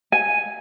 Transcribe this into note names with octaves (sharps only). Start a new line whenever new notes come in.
G#5